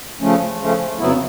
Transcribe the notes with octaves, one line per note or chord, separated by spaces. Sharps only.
C#3 F3 A3 C#4
C#3 F3 A3 C#4
F2 C#3 F#3 B3 E4